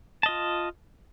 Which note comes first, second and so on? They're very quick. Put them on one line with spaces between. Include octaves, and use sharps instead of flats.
A5 D#5 F4